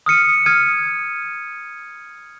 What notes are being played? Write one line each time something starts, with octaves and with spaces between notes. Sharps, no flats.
D#6 F6 C#7 D#7
D#6 F6 G#6 D#7